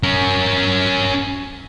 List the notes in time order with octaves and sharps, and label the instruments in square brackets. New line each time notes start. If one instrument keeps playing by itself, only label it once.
[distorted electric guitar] C#4 A#4